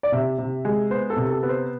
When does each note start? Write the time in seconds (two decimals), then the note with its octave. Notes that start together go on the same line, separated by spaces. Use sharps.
0.03 D5
0.12 C3 E5
0.38 C3
0.65 G#3
0.91 B3 C5
1.10 A4
1.17 C3
1.30 A4
1.43 B3
1.49 C5